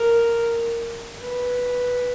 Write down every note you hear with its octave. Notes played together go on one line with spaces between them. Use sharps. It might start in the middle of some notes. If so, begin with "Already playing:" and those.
Already playing: A#4
B4